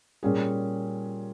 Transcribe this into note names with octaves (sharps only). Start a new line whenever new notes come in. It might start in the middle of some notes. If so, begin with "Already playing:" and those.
A#2 G3 C#4 G#4